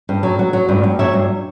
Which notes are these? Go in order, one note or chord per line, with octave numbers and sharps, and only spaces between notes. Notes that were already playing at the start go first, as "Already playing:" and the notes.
G2
F#3
F#3
F#3
G2
G2
F#3 C#5 E5
G2